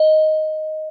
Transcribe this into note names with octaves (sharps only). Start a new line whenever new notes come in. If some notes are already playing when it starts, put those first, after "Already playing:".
Already playing: D#5